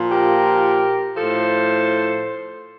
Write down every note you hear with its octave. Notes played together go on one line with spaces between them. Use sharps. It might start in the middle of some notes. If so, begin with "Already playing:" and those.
Already playing: A#2 F3
G4 A#4
A2 F3 A4 C5